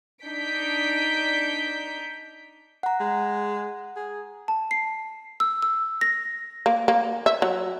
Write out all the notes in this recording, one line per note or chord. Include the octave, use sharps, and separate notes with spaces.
D4 D#4 G6 B6 D7
F#5 A#5
G#3
G#4
A5
C7
E6
E6
A#6
A#3
A#3
E5
F#3